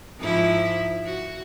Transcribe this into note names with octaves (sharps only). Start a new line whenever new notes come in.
G#2 F3 E4
F#4